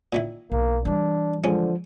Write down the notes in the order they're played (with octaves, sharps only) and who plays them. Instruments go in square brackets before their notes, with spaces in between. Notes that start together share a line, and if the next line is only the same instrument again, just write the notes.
[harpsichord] A#2 D#3 E4
[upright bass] B1 [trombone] A#3
[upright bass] E3 G3 [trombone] D4
[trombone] D3 [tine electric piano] F3 [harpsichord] G#3 C#4